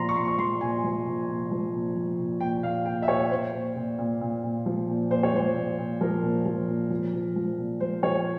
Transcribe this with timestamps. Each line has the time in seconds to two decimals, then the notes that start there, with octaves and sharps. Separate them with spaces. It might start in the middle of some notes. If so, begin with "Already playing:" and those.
Already playing: A#2 F3 A#5 C6
0.09 C#6
0.16 A#2 C6
0.28 C#6
0.38 F3 C6
0.61 A#2 G#5
0.84 F3
1.06 A#2
1.28 A#2
1.51 F3
1.73 A#2
1.96 F3
2.19 A#2
2.40 A#2 G5
2.63 A#2 F5
2.86 A#2 G5
3.02 E5
3.08 A#2 C#5
3.31 A#2 C5
3.54 A#2
3.76 A#2
3.98 A#2
4.21 A#2
4.43 A#2
4.66 F3
4.88 A#2
5.10 A#2 C5
5.23 C#5
5.33 F3 C5
5.56 A#2
5.78 A#2
6.01 F3 A#4
6.23 A#2
6.46 F3
6.68 A#2
6.90 F3
7.13 F3
7.36 F3
7.58 A#2
7.80 F3 C5
8.03 F3 C#5